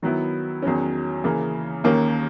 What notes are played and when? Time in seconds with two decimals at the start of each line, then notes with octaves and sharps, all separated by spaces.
0.02 D#3 F#3 B3 E4
0.62 E2 D#3 F#3 C#4
1.24 C#3 E3 A#3
1.84 D#2 D#3 A#3 C#4